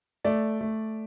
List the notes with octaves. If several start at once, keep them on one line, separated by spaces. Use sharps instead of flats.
A3 D5
A3